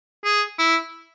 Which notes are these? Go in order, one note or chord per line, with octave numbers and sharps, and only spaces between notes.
G#4
E4